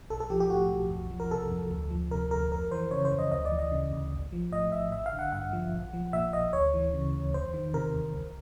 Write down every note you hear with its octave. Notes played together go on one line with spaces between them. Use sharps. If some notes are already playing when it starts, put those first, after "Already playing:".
B1 A4
A4
F3 G4
G4
A2 F#4
B1
F2
F3
A#4
C3 A4
F2
D2
F3
C3 A#4
D2 A#4
F2 A#4
E3 C5
C#3 C#5
C5
F2
D#5
D2 D#5
D5
E3
D#5
C#3
D2
A1
F3
A2 D#5
A1 E5
A1 E5
F5
D3
F#5
G2 F#5
F3
A#1
F3
A#2 E5
A#1 D#5
D2 C#5
E3
C#3
D2
E2 C5
D#3
C3 A#4
E2
C2